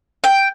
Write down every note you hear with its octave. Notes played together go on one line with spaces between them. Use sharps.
G5